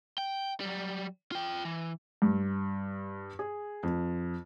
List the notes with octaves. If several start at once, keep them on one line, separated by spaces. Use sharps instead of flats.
G5
F#3 G3
F4 G5
E3
G2
G#4
F2